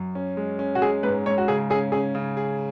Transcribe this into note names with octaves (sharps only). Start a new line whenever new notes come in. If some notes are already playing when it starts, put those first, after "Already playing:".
Already playing: F#2
C#4
G#3
C#4
F#4
G#3 G#4
G#2 B4
G#2 C#5
F#4
C#3 G#4
C#4 G#4
C#4 G#4
C#3
G#4